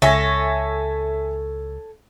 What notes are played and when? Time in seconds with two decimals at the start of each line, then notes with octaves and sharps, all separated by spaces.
0.02 C#2 A4 C#5 E5 G#5 A#6